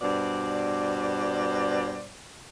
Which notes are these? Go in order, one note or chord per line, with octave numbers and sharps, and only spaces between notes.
G2 B2 C5 D5